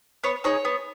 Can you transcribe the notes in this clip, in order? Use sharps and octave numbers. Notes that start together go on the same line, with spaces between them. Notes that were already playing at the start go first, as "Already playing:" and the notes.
B3 C#5
D#4 G#4 C#5
B3